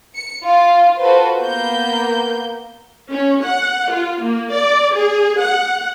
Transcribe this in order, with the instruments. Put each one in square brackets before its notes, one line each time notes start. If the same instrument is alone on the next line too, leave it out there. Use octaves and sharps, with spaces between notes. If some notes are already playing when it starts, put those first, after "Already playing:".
[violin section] C#7
F4 F5
F4 F#4 A4 B4 C5
A#3 B3 G6
[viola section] C#4
F#5
F4
A#3
D5
G#4
F#5